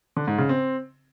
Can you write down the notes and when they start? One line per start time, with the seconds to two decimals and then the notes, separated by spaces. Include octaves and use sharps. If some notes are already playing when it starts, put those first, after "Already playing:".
0.17 D3
0.27 G#2
0.38 C#3
0.49 C4